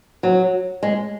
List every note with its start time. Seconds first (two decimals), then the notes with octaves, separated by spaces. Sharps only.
0.23 F#3
0.83 G#3